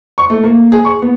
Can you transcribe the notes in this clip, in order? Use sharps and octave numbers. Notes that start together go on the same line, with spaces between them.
C#6
A3
A#3
G#4
C#6
B3